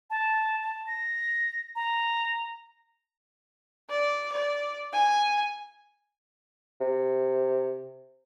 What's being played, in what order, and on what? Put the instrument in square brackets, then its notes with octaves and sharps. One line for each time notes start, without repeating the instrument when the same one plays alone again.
[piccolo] A5
A5
A#6
A#5
[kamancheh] D5
D5
G#5
[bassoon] C3